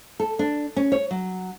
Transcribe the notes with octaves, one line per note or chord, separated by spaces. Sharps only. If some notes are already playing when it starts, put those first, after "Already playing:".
A4
D4
C#4
C#5
F#3